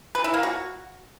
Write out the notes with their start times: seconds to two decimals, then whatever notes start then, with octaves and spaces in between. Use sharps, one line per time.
0.15 B4
0.24 E4
0.34 A#3
0.43 F#4